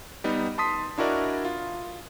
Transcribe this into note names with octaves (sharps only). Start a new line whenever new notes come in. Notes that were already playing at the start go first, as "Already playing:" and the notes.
G3 B3 D#4
A5 C6 D#6 B6
D4 E4 F#4 A#4 D5 D#5
F4